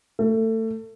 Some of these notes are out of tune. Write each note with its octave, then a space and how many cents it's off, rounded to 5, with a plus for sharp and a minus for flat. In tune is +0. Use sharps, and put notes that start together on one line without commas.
A3 +25